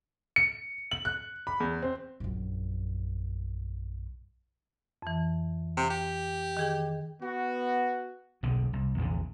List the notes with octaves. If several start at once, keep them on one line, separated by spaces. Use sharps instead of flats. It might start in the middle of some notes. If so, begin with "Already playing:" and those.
C#7
F#7
F#6
B5
E2
C4
A#1 F#2
F2 E3
C3
G4
D#3 G#4 G5
B3 F#4
F#1 B1 B2 D3
C2
A#1 E2 A#2 D3